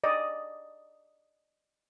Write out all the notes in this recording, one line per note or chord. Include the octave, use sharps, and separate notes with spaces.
D5 D#5